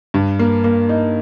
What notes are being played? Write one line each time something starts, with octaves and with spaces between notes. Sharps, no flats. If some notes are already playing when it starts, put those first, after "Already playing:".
G2
A#3
A#3
D#4